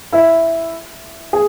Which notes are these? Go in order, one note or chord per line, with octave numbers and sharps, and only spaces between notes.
E4 E5
G#4